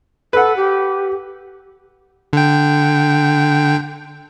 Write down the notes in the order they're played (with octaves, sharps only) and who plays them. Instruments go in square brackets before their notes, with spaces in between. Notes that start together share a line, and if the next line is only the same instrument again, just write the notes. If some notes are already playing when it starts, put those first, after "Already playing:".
[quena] A4 [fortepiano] B4 F#5
[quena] G4
[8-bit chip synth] D3 G5